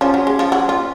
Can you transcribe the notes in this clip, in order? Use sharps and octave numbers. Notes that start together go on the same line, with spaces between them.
F3 C#4
F#3
G#3
F3
F#3
F4